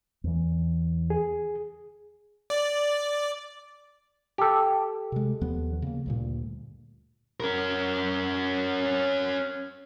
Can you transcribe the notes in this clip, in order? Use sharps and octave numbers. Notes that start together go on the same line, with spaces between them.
E2 E3
G#4
D5
G4 A4
C3 G#3
D#2 F3 B3
C#3 A#3
D2 G2 A#2
C#4 A#4